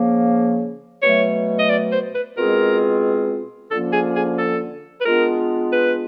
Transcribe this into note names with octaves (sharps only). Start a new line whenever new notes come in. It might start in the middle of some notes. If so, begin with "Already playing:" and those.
Already playing: C#3 F3 A#3
B2 F#3 A3 C#5
D#5
D5
C5
B4
B2 G#3 C4 F4 G#4 A#4
D3 F3 A#3 C#4 F4 A4
G#4
G#4
A4
B4
G#3 B3 D4 F4 A#4
B4